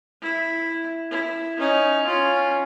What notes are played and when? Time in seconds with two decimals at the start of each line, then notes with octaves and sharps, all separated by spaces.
0.22 E4
1.11 E4
1.58 C#4 D#4
2.06 C#4 F4